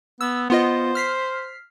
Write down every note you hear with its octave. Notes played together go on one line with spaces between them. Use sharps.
B3 E6
B3 F4 C5 D#5
F6 B6 C7